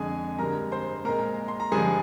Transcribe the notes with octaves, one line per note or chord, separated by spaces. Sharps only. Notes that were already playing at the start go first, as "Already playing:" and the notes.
Already playing: F2 D3 G#3 G#4 G#5
G2 D3 G#3 A#4 A#5
C5 C6
A#2 G#3 A#4 A#5
C6
A#5
G2 D3 F3 G#3 G#4 G#5